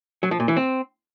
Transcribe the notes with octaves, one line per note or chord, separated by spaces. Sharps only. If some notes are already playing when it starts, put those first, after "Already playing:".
F#3
F3
A#2
E3
C4